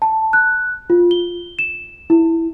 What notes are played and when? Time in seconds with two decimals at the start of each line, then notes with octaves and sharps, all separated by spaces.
0.02 A5
0.33 F#6
0.90 F4
1.11 G7
1.59 E7
2.10 E4